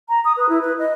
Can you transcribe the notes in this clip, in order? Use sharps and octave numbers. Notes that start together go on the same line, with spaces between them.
A#5
D#6
B4
E4
B4
D#5